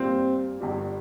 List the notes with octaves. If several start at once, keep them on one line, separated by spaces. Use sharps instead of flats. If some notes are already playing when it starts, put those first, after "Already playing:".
Already playing: A#2 G3 A#3 C4
G1 G2 G3